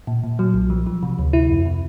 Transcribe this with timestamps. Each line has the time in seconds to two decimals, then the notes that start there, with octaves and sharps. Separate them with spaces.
0.07 A#2
0.24 A#2
0.39 F#3
0.54 B1
0.70 F3
0.87 F3
1.03 C3
1.19 D2
1.33 C3 E4
1.49 F2
1.66 C3